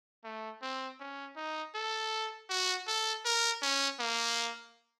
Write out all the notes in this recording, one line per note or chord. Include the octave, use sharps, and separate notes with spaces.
A3
C4
C#4
D#4
A4
F#4
A4
A#4
C#4
A#3